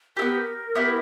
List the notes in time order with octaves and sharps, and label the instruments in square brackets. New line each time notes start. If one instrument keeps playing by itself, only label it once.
[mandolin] E4 G4 [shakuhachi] A#4
[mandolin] B3
B3 E4 G4